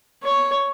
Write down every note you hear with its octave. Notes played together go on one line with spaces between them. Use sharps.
C#5